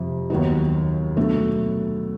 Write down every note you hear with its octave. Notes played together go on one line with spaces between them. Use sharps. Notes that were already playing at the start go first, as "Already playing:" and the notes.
Already playing: F2 C3 F3
D#2 D#3 F#3 B3 D#4
B2 F#3 A3 D4